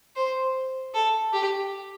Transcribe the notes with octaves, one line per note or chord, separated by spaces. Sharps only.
C5
A4
G4